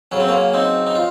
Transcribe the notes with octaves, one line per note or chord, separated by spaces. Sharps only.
C#3 F#3 C#4
C4
A#3 C#4
C4 D#4
D#4
F4